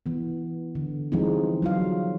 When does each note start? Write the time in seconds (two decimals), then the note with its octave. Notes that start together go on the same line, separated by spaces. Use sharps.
0.06 E3 B3
0.75 D3
1.12 E3 F3 G3 G#3 C4 D#4
1.62 F#3 F4 F5